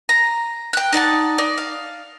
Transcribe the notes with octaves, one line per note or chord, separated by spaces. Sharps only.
A#5
G5 F#6
D#4 D5 F#5 A5
D#4 D5
F5